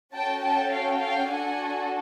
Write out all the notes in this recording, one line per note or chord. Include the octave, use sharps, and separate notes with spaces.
C#4 F#4 A4 G5 A5
G5 A5
F5 G5
F5 G5
D4 F#4 A4 F#5 G#5